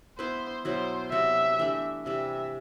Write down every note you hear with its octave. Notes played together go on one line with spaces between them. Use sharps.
B3 E4 B4 C5
B2 F#3 B3 E4 C5
C3 F#3 B3 F#4 E5
E3 A3 D4 G4
C3 E3 G3 E5